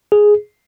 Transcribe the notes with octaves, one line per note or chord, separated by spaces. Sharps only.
G#4